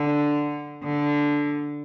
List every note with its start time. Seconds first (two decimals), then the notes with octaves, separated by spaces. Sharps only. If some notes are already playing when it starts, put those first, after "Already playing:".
Already playing: D3
0.84 D3